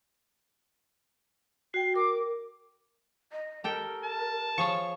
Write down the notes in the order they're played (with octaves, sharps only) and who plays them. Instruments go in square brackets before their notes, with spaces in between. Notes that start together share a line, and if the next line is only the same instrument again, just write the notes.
[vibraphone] F#4 G5 [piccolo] C7
[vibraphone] A#4 [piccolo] D6
[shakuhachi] D#5
[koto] G4 A4 G5 [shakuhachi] A#4
[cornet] A5
[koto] F3 G#4 C#5 [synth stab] C#6